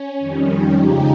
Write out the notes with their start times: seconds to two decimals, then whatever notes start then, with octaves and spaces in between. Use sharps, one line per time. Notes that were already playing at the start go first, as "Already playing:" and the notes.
Already playing: C#4
0.19 F2 D#3 G3
0.71 D#2 C#3 F3 G#3 D#4 G4